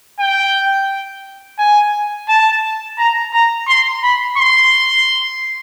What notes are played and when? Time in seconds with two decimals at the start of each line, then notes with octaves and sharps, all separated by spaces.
0.19 G5
1.58 G#5
2.28 A5
2.98 A#5
3.33 A#5
3.68 C6
4.03 B5
4.38 C6